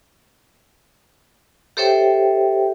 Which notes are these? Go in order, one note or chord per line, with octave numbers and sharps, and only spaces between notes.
G4 A4 C5 C#5 E5 G5